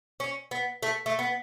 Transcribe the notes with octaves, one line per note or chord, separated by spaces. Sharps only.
C#4
B3
A3
A3
B3